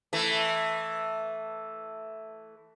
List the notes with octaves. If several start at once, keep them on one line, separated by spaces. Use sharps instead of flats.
E3 A3